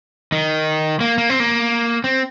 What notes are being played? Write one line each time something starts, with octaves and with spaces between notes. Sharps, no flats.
D#3
A#3
A#3
C4
A#3
C4